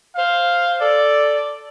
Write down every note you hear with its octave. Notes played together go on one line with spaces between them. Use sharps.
C5 F5
A4 D5